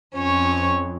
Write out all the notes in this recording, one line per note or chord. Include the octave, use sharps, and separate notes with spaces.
F2 C#4 C#5